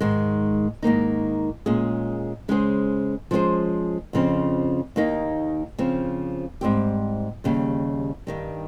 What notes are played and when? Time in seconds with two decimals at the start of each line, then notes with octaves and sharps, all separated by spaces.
0.01 G#2 D#3 G#3
0.82 G#2 D#3 A#3 D#4
1.66 A#2 G#3 C#4 G#4
2.48 C#3 G#3 C#4 G#4 C5
3.31 F3 G#3 C#4 G#4 C5
4.13 F2 C#3 F3 C4
4.96 D#2 D#3 A#3 D#4
5.79 C#3 F3 C4
6.61 G#2 G3 C4 G4
7.44 D#2 C#3 G3
8.27 G2 D#3 G3